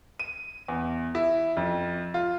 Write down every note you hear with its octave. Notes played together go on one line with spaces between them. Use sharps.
D#7
E2
E4
F2
F4